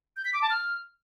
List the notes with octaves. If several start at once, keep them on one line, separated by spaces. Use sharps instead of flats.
G6
B6
D6
A5
F6